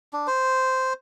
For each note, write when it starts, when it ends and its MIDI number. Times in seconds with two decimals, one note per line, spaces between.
0.13 0.27 62
0.27 0.93 72